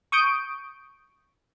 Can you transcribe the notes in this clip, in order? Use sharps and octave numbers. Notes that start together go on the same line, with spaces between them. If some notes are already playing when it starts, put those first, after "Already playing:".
C#6 D#6 G6 D7